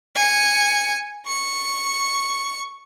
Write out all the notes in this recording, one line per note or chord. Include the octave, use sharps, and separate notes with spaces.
G#5 C#7
C#6 C#7